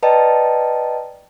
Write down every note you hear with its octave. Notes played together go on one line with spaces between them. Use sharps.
B4 D5 D#5 G5 A5 A#5